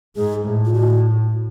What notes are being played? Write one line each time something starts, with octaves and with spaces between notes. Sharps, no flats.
G#2 G#4
A2
F4
A2 F#4